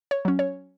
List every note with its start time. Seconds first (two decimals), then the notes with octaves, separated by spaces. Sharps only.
0.11 C#5
0.25 F#3 C#4
0.39 C#5